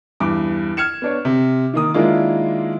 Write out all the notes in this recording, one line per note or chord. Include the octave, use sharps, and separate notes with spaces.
E2 G2 D6
F6 G#6 C#7 E7
B3 D4 C#5
C3
D#3 A#3 D#6
D#3 G#3 A#3 D4 E4 F4